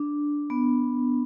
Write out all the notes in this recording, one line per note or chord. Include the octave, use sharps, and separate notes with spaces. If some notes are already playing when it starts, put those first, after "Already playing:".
Already playing: D4
B3